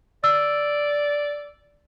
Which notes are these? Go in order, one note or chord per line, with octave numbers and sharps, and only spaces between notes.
D5 E6